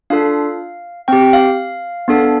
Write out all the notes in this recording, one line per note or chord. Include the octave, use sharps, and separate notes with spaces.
D4 F4 A4 F5
C4 G4 G5
F5
B3 D4 A4